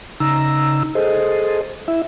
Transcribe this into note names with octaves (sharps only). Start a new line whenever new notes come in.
C#3 D#4 A#5 E6
G#4 A4 C5 D#5
E4 E5